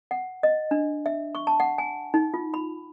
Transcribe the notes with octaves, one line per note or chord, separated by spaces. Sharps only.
F#5
D#5
D4
E5
C#6
A5
F#5
G#5
D#4
F4
B5